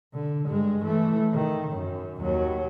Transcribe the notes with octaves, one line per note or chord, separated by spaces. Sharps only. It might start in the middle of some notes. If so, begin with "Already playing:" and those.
D3
G2 G#3
E3 A3
D#3
F#2
D#2 F#3